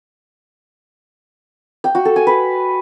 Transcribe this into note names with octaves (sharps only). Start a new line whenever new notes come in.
G5
F#4
A4
G#5
B4